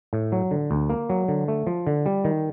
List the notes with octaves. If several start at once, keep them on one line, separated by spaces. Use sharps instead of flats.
A2
F#3
D3
D2
A#3
F#3
D3
A3
F3
D3
G3
D#3